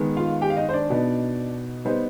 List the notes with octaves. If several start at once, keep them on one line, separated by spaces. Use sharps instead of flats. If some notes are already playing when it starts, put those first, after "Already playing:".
Already playing: D#3 G#3 B3
F4 F5
G4 G5
F5
D#4 D#5
C5
D4 D5
B2 B3 D#4
G3 B3 D#4 C5